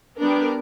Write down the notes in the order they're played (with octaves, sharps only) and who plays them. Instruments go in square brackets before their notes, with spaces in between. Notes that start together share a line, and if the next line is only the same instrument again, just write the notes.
[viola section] G3 B3 D4 A#4